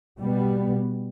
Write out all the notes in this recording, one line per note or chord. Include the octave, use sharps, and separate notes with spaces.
B2 G3 B3